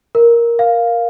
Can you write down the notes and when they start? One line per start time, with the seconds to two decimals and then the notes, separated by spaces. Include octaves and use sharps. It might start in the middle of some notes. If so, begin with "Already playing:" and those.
0.15 A#4
0.59 F5